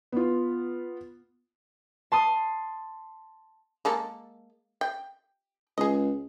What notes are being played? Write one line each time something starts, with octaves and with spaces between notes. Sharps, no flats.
B3 F4
A5 C6 D#6
G#3 A#3 A4
G5
C#2 G#4 D#5